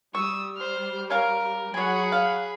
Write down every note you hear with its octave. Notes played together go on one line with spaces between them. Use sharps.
G3 C#6 D#6 E6
C5 F6
C#4 A#4 F5
F#3 G#4 C#5 F#5 G#5 B5
F5